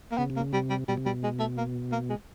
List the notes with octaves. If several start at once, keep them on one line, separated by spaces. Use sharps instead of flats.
A#3
C#3 B3
C3
A#3
C#3
C3 G3
G3
B2 G3
C3
B2 G3
G#3
A3
A#3
A#3
G#3